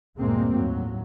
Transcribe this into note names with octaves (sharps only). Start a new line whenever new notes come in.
D2 G2 A#2 G#3 A#3 C4
D#2 A2 F#3